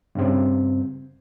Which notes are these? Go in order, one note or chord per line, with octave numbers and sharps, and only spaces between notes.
G2 C#3 C4